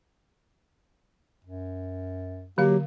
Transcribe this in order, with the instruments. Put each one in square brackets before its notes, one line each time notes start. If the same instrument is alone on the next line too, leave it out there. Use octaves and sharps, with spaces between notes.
[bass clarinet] F#2
[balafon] D3 F5 [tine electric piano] F#3 [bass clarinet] A#3 [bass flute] G4